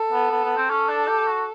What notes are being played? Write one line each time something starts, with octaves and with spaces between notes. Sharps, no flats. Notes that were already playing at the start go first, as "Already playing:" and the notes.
Already playing: A4
B3
B3
B3
C4
C#4 A4
D4
G4
F#4